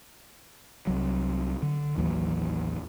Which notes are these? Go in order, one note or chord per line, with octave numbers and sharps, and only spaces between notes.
C2 F#3
D3
A1 D#2 E3 F#3